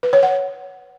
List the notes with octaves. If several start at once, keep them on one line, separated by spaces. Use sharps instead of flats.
B4
C#5
F#5